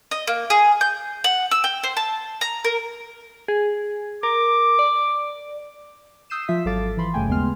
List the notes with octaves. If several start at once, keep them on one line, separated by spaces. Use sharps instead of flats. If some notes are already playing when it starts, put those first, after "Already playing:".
D#5
A#3
G#4
G6
F#5
E6
G5
C5
A5
A#5
A#4
G#4
A#4 D6
D5
D#6 E6 G6 C7 D#7 E7
F3 F4 E5 B6
G#1 F#3 A4 F5 D6 A6
E3 F3 B5 C6
G1 G2 C#3 A3 G5 G#5
D#2 C#3 G#3 B3 C6 F6